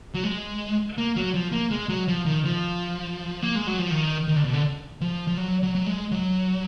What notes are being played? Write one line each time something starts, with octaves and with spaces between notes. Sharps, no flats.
F#3
G#3
A#3
F#3
F3
A#3
G#3
F#3
F3
D#3
F3
A#3
G#3
F#3
F3
D#3
D#3
D3
B2
D3
F3
F3
F#3
F#3
F#3
G#3
F#3